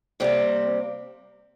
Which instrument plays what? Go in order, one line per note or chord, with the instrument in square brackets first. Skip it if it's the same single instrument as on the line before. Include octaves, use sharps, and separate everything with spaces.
[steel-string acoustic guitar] C3 G3 A#3 C4